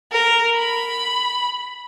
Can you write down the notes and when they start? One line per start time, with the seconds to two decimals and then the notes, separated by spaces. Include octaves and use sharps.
0.12 A#4
0.56 B5